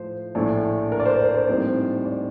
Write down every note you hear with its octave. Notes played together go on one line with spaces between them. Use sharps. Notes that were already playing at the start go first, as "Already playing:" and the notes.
Already playing: A2 F3 A3 C5
A#1 A2 A3 D4
A#4
D5
C5
D5
C5
A#1 A2 G3 C4 D#4
D5